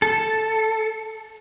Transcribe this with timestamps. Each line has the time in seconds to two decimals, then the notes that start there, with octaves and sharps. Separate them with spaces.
0.02 A4